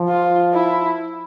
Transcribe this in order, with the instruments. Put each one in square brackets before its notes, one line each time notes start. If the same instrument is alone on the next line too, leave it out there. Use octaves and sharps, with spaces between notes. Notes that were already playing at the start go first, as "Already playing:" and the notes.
Already playing: [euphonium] F3
[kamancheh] F4
E4